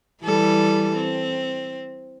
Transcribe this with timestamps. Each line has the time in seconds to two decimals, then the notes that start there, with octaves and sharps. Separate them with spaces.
0.23 E3 G3 A4
0.96 C4